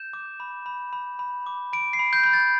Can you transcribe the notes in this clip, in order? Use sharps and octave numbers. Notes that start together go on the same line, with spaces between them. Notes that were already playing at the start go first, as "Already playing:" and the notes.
Already playing: G6 E7
D6
B5
B5
B5
B5
D6
B5 D7
C7
B5
G6
B5 G6
A6